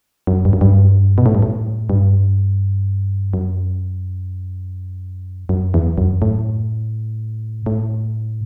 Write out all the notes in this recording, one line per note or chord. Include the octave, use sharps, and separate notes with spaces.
F#2
G2
F#2
G2
B2
A2
G2
A2
G2
F#2
F#2
E2
F#2
A2
A2